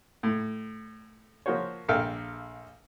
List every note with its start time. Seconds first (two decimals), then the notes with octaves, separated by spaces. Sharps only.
0.23 A2
1.46 F3 A#3 F#4 C5 C#5
1.88 A#1 A4 A#4 E5 F5 G5